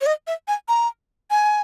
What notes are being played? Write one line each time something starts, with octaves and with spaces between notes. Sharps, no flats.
C#5
D#5
E5
G#5
A#5
G#5